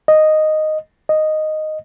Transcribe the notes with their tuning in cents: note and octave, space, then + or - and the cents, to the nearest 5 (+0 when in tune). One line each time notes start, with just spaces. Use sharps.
D#5 -5
D#5 -5